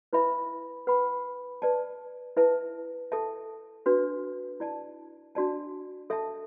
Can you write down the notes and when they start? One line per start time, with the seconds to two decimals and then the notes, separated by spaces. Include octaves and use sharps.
0.13 E4 B4 E5 B5
0.87 B4 F#5 B5
1.62 B4 D5 A5
2.37 E4 B4 E5 A5
3.12 A4 E5 A5
3.86 D4 F#4 B4
4.60 E4 D5 A5
5.35 D4 F#4 D5 A5
6.10 A4 E5 A5